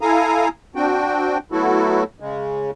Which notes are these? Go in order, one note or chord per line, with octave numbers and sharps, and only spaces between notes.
E4 A4 F5 G#5 A#5 D#6
C4 D4 F#4 G5
F#3 A3 B3 E4 F#4 A4
C#3 G#3